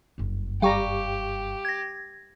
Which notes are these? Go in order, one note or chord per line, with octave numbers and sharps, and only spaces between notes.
F#1 G2
G3 G4 F5 G5 A#5 C#6
G#6 A#6